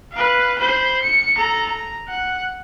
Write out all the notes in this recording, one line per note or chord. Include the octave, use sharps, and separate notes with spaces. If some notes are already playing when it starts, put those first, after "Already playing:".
B4 F5
C5 B5
C#7
A4 A#5
A#5
F#5